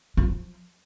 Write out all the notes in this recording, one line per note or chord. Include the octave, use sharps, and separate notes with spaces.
F4
E3
F3